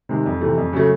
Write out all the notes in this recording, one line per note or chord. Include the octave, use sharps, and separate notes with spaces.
C3 D#3 G#3
F2
C3 E3 A3
F2
C#3 F#3 A3